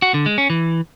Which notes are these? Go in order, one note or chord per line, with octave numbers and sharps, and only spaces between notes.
F#4
D3
G#3
C#4
E3